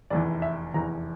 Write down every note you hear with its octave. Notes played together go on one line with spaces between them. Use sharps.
F1 E2 E3 D5
E5
F1 E2 E3 A#5